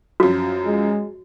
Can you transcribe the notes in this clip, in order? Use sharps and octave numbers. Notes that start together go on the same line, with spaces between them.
F#2 F3 F#4
G#3